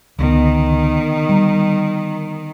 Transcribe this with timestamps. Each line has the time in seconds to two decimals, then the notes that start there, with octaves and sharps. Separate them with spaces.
0.19 C#2 D3 D#3 B3
1.29 G3 A#5